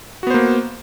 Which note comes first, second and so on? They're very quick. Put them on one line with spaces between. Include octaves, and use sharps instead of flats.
F#4 B3 C5 A#3